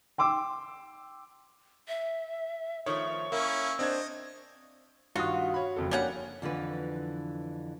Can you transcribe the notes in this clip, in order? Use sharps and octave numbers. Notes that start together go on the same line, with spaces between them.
G5 C6 D6 E6
E5
D#3 F3 A3 C#5 C#6
A#3 C#4 E4
C4 D4 C5 D#5 G#6
G2 D#3 F4 F#4 D#6
C#5 B5
F#1 F2 A4
G3 A#3 C#4 D4 F#5
F2 D3 E3 B4